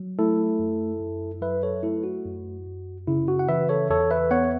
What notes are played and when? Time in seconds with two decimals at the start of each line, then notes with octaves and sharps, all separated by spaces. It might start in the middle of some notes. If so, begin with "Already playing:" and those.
Already playing: F#3
0.19 A3 E4 A4
0.59 F#2
1.00 F#2
1.42 F#3 B4 E5
1.63 A4 C#5
1.83 A3 E4 A4
2.04 F#4
2.25 F#2
2.67 F#2
3.07 C#3 E4
3.28 F#4
3.39 F#5
3.49 E3 B4 E5
3.69 A4 C#5
3.90 E2 A4 C#5
4.11 B4 E5
4.31 B3 C#5 F#5